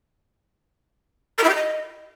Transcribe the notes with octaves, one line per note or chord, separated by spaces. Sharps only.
A#4
E4
G4
D#5